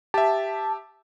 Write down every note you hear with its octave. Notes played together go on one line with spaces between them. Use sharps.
G4 E5 A5